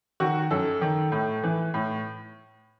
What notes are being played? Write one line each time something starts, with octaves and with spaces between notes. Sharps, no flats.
D#3 F#4
F#2 A4
D#3
A2
E3
A2